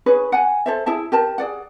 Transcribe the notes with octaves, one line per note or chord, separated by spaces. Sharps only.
D#4 G#4 B4 C#5
F#5 G#5
A4 C5 E5
E4 G#4 E5 A5
G4 A#4 A5
G#4 D5 F#5